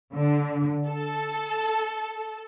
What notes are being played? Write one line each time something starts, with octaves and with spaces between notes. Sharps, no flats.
D3
A4